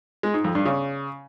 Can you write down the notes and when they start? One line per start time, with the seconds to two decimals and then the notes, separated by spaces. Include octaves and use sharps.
0.23 G#3
0.34 G#2
0.44 F2
0.55 G2
0.65 C#3